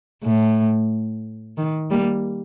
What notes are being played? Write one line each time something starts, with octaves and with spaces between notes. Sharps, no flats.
A2
D#3
G3 A#3